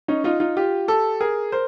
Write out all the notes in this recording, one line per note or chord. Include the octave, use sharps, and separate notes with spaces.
C#4 D#4
D#4 F4
D#4 F4
F4 G4
G4 A4
G#4 A#4
A#4 C5